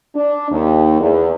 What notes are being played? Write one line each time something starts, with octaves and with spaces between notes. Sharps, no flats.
D4
D#2
E2